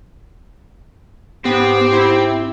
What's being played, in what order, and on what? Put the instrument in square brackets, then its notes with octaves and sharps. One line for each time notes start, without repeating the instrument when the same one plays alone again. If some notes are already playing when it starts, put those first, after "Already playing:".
[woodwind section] G#2 [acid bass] B3 [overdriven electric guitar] C4 [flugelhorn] G4
[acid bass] E4